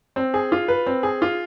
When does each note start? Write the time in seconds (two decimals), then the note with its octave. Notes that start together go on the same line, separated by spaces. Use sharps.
0.16 C4
0.34 G#4
0.52 F4
0.68 B4
0.87 C4
1.03 G#4
1.22 F4